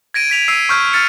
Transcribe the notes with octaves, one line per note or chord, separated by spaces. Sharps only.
G#6 A#6 D7 D#7
G#6 B6 F7
E6 C7 D#7
C#6 E6 F6 G6
F6 A6 C#7